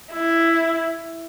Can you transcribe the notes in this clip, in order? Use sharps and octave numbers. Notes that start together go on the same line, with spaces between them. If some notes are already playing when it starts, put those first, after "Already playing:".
E4